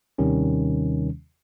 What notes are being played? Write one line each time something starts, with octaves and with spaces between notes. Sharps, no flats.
D#2 C3 D#3 G3 C#4